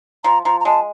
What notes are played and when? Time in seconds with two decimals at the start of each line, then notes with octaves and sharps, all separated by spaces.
0.24 F3 A#5
0.45 F3 A#5
0.60 A#5
0.65 G#3 A5